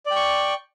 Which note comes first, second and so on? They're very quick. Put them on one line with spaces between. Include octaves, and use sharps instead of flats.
D5 G5 C#6